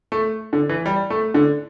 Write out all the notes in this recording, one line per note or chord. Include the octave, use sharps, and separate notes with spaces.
A3
D3
E3
G3
A3
D3